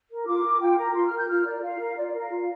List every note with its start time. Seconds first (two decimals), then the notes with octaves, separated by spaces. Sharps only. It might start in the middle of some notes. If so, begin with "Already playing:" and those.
0.10 A#4
0.27 F4 D6
0.44 A#4
0.61 F4 G5
0.78 A#4 A#5
0.95 F4 C6
1.07 A#4 F6
1.18 G6
1.29 F4 F6
1.46 A#4 D5
1.62 F4 F5
1.80 A#4
1.97 F4 D5
2.08 D5
2.14 A#4
2.19 F5
2.30 F4